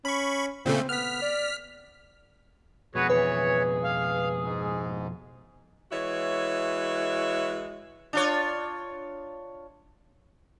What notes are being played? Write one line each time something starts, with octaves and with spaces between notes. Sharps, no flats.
C#4 B5 C#6
A#2 C#3 A3 C4
B3 F6 B6
D5
F2 B2 F#4 G#4 B4 C#5
E3 B4 C#5
F5
G#2
E3 G#3 F#4 C#5 E5
D4 F4 C#5